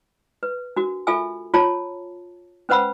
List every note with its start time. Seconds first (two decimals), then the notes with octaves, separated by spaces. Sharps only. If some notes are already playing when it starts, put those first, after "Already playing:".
0.43 B4
0.76 D4 F#4 A#4
1.07 F4 A4 A#4 E5 G#5 E6
1.54 F4 C#5 A5 A#5
2.69 C#4 B4 C5 F#5 B5 E6